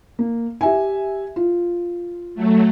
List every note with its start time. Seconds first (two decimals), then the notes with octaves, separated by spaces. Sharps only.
0.19 A#3
0.61 G4 E5 G#5
1.36 F4
2.35 F#3 A3